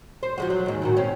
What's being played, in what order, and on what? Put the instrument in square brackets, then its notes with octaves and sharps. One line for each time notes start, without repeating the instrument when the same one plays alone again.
[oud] C5
F3 G#3 F#4
F#3
D#2 G#2
A2 D#3 F#4
C4 C#4